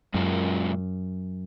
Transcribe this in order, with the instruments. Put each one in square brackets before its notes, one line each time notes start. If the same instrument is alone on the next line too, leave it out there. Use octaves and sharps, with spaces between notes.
[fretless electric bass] F#2 [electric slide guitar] A#2 G#3 C#4 F4 A#4